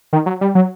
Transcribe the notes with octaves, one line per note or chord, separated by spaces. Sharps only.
D#3
F#3
G3
F#3